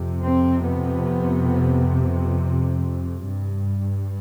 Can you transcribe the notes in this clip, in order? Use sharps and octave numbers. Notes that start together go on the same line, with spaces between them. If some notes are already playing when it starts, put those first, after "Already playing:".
Already playing: F2 C3
C4
B3
G2